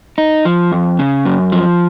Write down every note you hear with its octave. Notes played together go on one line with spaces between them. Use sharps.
D#4
F3
F2
C#3
F#2
F3